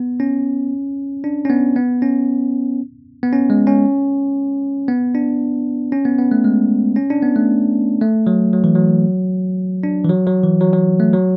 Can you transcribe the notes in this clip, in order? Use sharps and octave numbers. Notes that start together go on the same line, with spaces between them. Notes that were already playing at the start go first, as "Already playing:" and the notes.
Already playing: B3
C#4
D4
C#4
B3
B3
C#4
B3
C#4
G#3
C#4
B3
D4
C#4
B3
B3
A3
G#3
C#4
D4
B3
A3
A3
F#3
F#3
E3
F#3
D4
E3
F#3
F#3
E3
F#3
F#3
A3
F#3